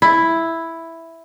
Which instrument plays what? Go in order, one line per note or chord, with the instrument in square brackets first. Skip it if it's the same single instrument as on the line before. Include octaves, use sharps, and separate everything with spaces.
[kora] E4